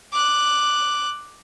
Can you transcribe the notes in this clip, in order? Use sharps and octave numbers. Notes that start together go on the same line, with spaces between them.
D6 F#6